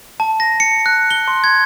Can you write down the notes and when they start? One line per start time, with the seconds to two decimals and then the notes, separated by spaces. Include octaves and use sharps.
0.20 A5
0.40 A#6
0.60 C#7
0.86 F#6
1.11 G7
1.28 C6
1.44 G#6